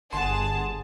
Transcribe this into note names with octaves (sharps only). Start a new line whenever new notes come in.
G1 G#4 F#5 A5 C6